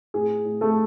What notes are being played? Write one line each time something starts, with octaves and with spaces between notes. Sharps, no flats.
A2 G#4
A2
A3 A4